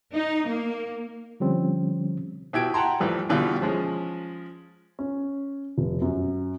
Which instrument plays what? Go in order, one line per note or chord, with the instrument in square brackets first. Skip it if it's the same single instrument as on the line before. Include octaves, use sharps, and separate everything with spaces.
[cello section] D#4
A#3
[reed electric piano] D3 F3 G3 C4 C#4
[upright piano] B2 E4 G4 G#6 D7
F#5 G5 A5 A#5 C6
A2 E3 F3 G3
B2 D3 E3 G3 B3 F4
F3 G#3 C#4
C#4
F1
F#2